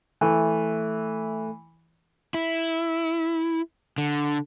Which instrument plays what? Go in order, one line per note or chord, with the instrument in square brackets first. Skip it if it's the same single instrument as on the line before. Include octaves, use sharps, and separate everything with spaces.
[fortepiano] E3 [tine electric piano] A3
[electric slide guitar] E4
D3